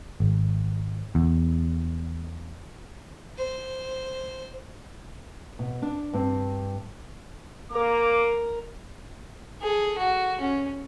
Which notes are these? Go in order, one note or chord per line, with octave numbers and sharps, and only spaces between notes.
G#1
E2
C5
B2
D4
G2 C4
A#3 A#4 D6
G#4 A4
F#4
C#4